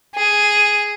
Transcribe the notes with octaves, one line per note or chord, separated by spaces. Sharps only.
G#4